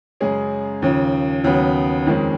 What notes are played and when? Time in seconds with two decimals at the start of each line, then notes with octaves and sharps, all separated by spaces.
0.21 F#2 C#3 G#3 C#4 G#4
0.82 D#2 C#3 F3
1.44 D#2 C#3 F#3 B3
2.06 F2 D#3 G#3 C#4